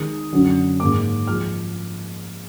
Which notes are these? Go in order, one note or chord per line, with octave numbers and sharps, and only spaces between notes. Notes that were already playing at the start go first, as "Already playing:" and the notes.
Already playing: D#3 G#3 D#4 D#6
F#2 D3 F#3
G#2 D#3 A#3 D6
F3 G#3 F6